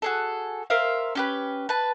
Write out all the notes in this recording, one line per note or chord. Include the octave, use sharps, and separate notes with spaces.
F#4 G#4 A4
A#4 C5 E5 F5
C#4 G4 B4
B4 A5